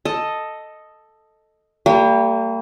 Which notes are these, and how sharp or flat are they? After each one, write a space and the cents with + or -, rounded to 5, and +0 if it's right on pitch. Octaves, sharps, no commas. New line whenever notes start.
A4 +0 D#5 +0
G3 +0 A#3 -40